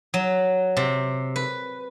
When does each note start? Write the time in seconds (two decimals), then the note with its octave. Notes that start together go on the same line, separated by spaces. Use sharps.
0.14 F#3
0.77 C3
1.36 B4